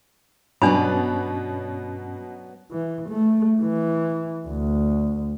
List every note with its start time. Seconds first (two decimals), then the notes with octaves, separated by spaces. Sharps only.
0.62 G2 B2 F#3 B3 C#4 D4 D5 B5
2.72 E3
3.09 A3
3.61 E3
4.48 D2